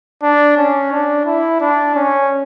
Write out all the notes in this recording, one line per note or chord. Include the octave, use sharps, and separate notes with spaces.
D4
C#4
D4
E4
D4
C#4